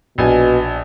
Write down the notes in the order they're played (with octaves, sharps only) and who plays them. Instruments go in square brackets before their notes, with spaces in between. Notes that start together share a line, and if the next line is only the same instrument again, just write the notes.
[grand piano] A#1 G#5 [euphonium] B2